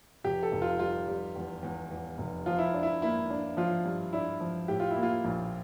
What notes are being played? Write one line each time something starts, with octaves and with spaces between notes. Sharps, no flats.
F1 G4
A4
F1
F4
G3 F4
G3
E2
E2
E2
F1
F3 F4
E4
D4
E4
A#3 E4
D4
F3 F4
G2
D4 E4
F3
A2 G4
F4
E4
A#3
F4
A#1